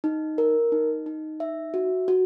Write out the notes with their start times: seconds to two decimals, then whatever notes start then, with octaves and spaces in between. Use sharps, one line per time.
0.04 D#4
0.38 A#4
0.72 D#4
1.06 D#4
1.40 E5
1.74 F#4
2.08 F#4